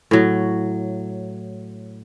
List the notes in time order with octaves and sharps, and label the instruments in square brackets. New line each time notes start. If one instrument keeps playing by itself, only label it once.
[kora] A2 F#3